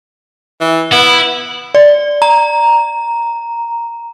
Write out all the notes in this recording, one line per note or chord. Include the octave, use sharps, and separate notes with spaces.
E3
B3 E4
D5
A#5